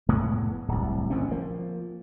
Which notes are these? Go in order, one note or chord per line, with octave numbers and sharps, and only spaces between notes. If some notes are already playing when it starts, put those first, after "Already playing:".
F1 A2 G#3 B3
D1 C2
A1 A#2 C4 C#4
F3 A#3